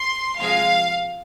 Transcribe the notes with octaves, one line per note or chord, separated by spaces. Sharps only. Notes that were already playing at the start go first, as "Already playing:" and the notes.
Already playing: C6
C3 F3 G#3 F5